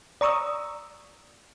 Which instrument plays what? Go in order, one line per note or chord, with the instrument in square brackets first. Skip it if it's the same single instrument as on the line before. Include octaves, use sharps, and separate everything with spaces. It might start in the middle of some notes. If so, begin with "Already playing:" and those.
[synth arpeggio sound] D5 A#5 C#6 D#6 E6